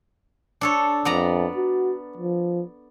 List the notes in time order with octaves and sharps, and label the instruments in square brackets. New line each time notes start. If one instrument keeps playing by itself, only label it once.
[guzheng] D4 A4 C#5
[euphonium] F2 [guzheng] B3 D5 A#5
[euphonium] F#4
F3